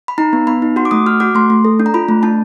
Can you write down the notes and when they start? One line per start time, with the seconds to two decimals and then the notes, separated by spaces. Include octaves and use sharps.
0.08 B5
0.18 D#4 A#5
0.33 B3
0.47 B3 B5
0.62 D#4
0.76 F#4 C6
0.85 D6
0.91 A3 D#6
1.06 F#4 F6
1.20 F#4 D6
1.35 A3 C6
1.50 A3
1.65 A4
1.80 D4
1.86 A#5
1.94 F4 B5
2.09 A3
2.23 D4 A5